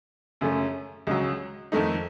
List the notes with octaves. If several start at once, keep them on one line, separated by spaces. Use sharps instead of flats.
F#2 C#3 A3 C#4
C#2 C#3 F#3
F2 D#3 A3 D#4